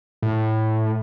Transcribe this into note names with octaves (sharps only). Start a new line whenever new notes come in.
A2